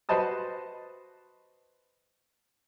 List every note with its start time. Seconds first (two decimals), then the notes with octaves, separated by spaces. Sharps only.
0.09 F#4 B4 C5 D#5 A5 D#6